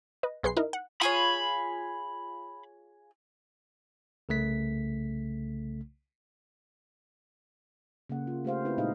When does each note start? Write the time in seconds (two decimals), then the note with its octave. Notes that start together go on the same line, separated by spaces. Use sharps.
0.23 B4 D#5
0.43 B1 G#4 B4 C6 C7
0.57 D#4 E4 A#4
0.73 F#5
1.01 F4 G#4 C#5 B5
4.29 C2 C#3 A3 B6
8.10 C#3 A#3 F#5
8.27 F4
8.45 A3 G4 C5 F5
8.65 C4 E4 F#4 B4
8.78 A#2 G#3 D#4 G#4 D#5 F5